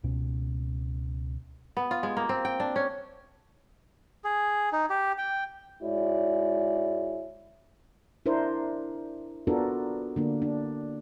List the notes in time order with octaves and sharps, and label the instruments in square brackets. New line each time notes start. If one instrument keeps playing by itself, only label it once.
[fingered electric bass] C#2 B2 C#4
[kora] B3
F4
G#3
A#3
C4
G5
D4
C#4
[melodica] G#4
D#4
G4
G5
[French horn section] G#2 G#3 E4 F#4 C#5 D5
[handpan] D4 E4 A#4 C5
B3 D4 F4 F#4 A4 A#4
D3 A#3 D4
D4